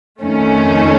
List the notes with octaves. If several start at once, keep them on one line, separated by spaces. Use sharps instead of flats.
F2 D#3 A3 C#4